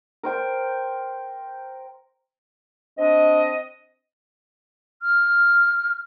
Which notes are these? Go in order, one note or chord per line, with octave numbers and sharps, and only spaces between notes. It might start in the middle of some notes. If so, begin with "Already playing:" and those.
A#4 C5 G5 C6
C4 D4 D#5
F6